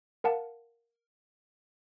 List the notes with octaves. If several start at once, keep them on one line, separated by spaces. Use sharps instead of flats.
A#4 F5 F#5 A5